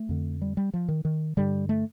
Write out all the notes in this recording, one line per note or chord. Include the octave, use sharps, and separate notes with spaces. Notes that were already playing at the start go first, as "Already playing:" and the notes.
Already playing: A3
F2 D3
G3
G3
F3
D#3
D#3
G2 D3 G3
A3